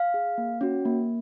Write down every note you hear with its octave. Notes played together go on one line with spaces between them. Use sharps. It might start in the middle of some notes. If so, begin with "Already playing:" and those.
Already playing: F5
G#4
A#3
C#4 F#4
A#3